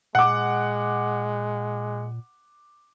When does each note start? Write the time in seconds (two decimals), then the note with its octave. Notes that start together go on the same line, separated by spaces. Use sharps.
0.15 A#2 G#3 F#5 D6